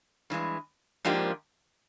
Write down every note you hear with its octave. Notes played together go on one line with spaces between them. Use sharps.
G2 E3 G#3
G#2 F3 A#3 D4 G4